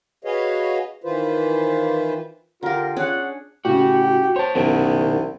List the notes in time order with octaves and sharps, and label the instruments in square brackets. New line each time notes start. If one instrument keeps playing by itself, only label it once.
[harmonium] F#4 G#4 B4 C#5 D#5 F5
D#3 E3 F4 B4 C5
[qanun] D3 G4 [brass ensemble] F4 [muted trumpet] A#4
[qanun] C#4 D4 G#4 [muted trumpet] F#5
[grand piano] A2 C#3 [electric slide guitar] F#4 [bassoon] G4
[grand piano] C5 [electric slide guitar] C#5 A5
[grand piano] F#1 D7 [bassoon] C2 [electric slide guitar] B2 D#3 B3